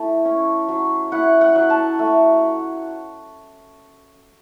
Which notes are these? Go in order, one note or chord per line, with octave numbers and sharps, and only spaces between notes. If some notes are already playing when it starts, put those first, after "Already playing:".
Already playing: A3 E4 A5 C#6
C#4
F#3
E4 F#5
F#5
F#3
A5
A3